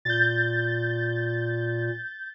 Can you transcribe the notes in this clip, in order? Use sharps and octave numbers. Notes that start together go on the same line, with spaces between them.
A#2 G6 A6